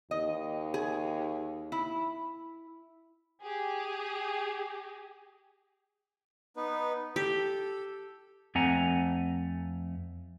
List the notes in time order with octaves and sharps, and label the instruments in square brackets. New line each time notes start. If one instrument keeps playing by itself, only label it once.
[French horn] D#2 [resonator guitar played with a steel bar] D#5
[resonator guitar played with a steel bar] G#4
E4
[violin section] G4 G#4
[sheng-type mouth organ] B3 D#4 B4
[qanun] G4 [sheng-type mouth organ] A4
[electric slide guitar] F2 A3 C4 F#5 G#5 A#5